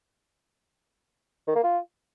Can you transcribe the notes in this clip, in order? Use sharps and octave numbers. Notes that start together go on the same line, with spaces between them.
D#3
A#3
F4